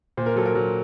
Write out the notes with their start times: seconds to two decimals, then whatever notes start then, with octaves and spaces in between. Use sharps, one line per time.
0.17 A#2 C5
0.26 A#4
0.36 F#3 A4
0.46 A#4
0.55 F#3